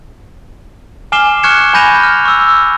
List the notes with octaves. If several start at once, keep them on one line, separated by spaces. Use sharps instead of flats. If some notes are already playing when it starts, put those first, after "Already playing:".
G#5 D6 F6 C7 E7 G7
C#6 F6 F#6 G#6 C#7 E7
G#5 B5 G6 A#6 D#7 F7
F6
C#6 E6